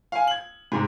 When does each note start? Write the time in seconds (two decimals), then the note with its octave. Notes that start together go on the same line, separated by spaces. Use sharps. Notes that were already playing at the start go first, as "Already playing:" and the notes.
0.12 F5 G#5
0.27 G#6 F#7
0.72 G#2 C3 G#3